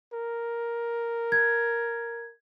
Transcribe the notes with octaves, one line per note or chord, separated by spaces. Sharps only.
A#4
G#6